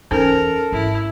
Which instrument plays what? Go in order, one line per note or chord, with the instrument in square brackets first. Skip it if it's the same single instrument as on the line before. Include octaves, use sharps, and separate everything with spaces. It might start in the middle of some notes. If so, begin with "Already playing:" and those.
[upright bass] E2 [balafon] C#4 D#4 C5 [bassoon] A4 [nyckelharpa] A#4
[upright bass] G#1 G#2 [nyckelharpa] E4